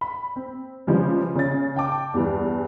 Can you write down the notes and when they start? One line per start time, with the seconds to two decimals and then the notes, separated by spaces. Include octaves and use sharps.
0.01 B5
0.36 C4
0.87 C#3 E3 F3 G3 G#3
1.35 C#3 C#5 A6
1.76 G5 A5 D6
2.14 E2 G2 E3